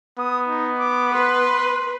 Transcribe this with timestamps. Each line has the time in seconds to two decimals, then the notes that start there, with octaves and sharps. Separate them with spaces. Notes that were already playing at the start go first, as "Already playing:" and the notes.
0.18 B3 D#6
0.48 D#4
0.79 D6
1.14 B4 C6